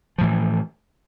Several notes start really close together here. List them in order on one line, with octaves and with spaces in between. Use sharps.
F3 A2 E3